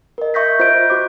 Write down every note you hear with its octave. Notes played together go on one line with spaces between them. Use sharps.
A#4 D#5
E5 C#6 D#6 G6 A#6 B6
F4 C5 D#5 F#6 G6 D7
F#4 C5 D6